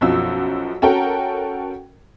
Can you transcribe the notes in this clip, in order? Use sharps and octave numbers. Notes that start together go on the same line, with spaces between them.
B1 F#2 F3 E6
C#4 F#4 A4 A#4 F#5 G5